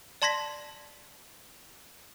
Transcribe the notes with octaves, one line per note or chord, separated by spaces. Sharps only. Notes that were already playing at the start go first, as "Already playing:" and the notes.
D5 A5 C6 G#6 A#6 B6